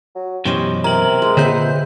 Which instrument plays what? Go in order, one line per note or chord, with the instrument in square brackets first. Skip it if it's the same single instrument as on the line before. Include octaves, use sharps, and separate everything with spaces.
[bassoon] F#3
[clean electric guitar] F#2 B2 E3 [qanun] C#4 C5 D#5 [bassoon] G4
[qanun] C3 [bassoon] A#4 [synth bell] A#5 F#7
[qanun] G#3
[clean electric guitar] A#2 [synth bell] D3 G6 [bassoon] C4 [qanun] B4 E5 F#5